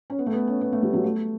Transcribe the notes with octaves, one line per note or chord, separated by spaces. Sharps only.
C#4
B3
A3
B3
C#4
B3
A3
G3
F#3
A3